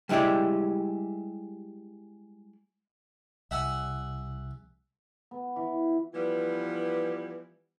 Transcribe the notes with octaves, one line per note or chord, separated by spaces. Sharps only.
G3 G#3 E4 G4 D5
C2 E5 F#5 G#5
B3
E3
E3 F3 G3 B3